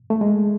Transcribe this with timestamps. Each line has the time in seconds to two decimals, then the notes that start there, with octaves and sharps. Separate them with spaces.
0.10 A3
0.21 G#3